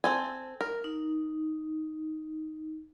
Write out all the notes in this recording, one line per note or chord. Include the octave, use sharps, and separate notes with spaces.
C4 A4 G#5
A#4
D#4